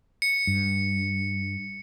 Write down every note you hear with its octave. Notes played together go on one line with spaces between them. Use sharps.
C#7
G2